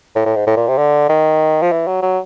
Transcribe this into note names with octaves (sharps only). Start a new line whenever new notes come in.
A2
A2
G#2
A2
A#2
C3
D3
D#3
F3
E3
F#3
F#3